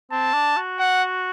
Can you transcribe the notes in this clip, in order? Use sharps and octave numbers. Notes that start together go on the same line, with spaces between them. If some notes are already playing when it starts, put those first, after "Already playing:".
C4 A5
D4
F#4
F#5